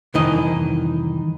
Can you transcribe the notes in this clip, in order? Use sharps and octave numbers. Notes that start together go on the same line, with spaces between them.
C2 F2 D#3 E3 D#5